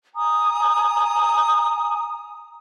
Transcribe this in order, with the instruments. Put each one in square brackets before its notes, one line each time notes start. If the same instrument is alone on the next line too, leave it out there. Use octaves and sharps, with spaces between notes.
[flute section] G#5 A#5 D#6